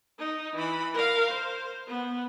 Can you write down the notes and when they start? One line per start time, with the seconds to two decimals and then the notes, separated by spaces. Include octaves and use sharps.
0.19 D#4
0.56 E3 B5
0.94 A#4 F5
1.32 C5
1.89 B3